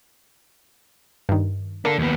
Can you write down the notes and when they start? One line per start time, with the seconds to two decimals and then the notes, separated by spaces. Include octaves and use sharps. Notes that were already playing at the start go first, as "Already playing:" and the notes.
1.29 G2 D#3
1.85 A#3 D4 A4
1.99 D#2 B3